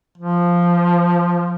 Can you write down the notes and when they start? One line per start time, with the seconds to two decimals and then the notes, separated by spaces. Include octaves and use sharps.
0.18 F3